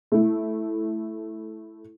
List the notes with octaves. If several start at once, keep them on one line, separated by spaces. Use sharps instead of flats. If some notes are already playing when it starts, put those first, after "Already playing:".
A3 E4